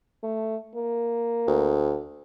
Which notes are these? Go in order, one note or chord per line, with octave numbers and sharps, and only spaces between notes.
A3
A#3
D2